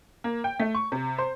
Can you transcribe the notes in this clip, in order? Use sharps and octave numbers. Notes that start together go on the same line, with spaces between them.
A#3
G5
A3
C#6
C3
C5